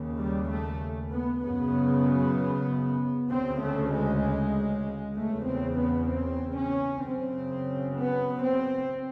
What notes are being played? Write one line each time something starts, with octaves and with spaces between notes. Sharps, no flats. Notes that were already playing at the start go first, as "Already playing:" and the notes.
Already playing: D#2 C#3
G3
A3
B3
F#2 C#3 B3
D2 C#3 C4
A3
G#3
E2 C#3 A3
C4
B3
C4
C#4
F#2 C#3 C4
B3
C4